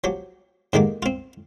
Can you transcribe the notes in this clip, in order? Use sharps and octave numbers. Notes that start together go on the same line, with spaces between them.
F3 F#3 G4
G#2 D3 D#3 A#3 G4
C4 F4